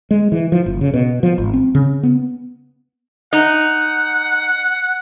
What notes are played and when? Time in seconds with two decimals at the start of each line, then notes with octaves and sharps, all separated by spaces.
0.11 G#3
0.32 E3
0.52 F3
0.66 F#1
0.81 C#3
0.94 B2
1.23 F3
1.38 G#1
1.54 C4
1.75 C#3
2.03 B3
3.33 D#4 F#5